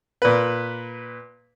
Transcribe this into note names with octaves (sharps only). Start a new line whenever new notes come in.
A#2 B4